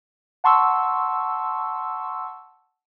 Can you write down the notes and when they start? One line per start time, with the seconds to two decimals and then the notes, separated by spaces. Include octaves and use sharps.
0.44 F#5 A5 C6 C#6 E6